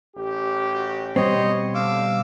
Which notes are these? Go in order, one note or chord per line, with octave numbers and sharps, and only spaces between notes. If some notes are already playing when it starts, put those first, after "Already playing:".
A1 G4
F#4
B2 G3 C4 C5 C#5 D#5
D3 F5 D6 E6